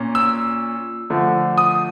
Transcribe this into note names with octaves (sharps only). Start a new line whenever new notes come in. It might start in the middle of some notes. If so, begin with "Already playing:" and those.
Already playing: A#2 C#4
E6
D3 F3 A3
D#6